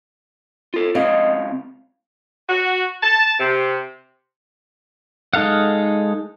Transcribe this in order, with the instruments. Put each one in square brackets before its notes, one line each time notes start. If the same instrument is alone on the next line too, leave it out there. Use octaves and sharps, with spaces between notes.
[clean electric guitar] F4 A4
[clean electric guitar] C#2 C4 F5 [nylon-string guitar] D#5
[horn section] F#4
A5
C3
[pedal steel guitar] G#3 D#4 A4 F5 F#5